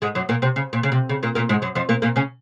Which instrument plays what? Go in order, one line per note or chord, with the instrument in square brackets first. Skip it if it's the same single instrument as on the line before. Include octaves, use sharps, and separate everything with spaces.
[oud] G#2 G#3
F#2 F#3
A#2 A#3
C3 C4
C#3
A#2
C#3
C3
C#3
A#2 A#3
A#2 A#3
G#2 G#3
F#2 F#3
F2 F3
A#2 A#3
A#2 A#3
C#3 C#4